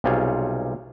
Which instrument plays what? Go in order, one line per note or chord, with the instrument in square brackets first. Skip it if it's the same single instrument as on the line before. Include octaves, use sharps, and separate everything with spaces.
[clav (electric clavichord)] B1 C3 G3 F4 G#4 C#5